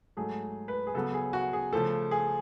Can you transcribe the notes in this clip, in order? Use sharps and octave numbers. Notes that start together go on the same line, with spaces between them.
G#2 F#3 A3 G#4
B4
G#4
C#3 F#3 B3 A4
G#4
F#4
G#4
C#3 F3 A3 A4
G#4